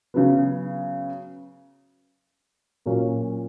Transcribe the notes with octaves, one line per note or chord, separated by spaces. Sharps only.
C#3 F#3 B3
A#2 F#3 A#3 C#4